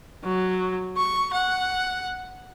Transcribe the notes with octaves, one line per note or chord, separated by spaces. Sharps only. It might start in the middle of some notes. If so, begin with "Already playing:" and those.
F#3
C#6
F#5